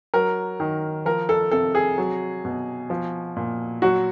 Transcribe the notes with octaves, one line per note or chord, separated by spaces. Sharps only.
F#3 A#4
D#3
F3 A#4
A4
C3 A4
G#4
F#3
B2
F3
A#2
F#3 F#4